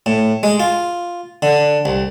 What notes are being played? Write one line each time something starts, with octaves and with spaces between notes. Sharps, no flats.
A2
G#3
F4
D3
C2